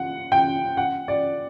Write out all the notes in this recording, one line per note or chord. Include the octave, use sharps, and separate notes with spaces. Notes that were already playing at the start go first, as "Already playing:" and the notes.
Already playing: F#5
G5
F#5
D5